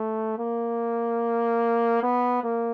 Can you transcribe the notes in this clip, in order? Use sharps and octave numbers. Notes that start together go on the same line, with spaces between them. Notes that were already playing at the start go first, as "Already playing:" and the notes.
Already playing: A3
A#3
B3
A#3